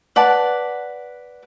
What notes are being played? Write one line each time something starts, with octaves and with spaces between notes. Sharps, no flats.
B4 D5 F#5 A5